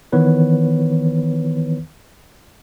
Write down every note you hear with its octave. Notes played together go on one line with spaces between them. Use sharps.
D#3 E3 B3 B4 C#5